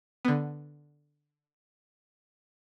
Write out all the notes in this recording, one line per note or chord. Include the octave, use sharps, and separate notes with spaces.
D3 B3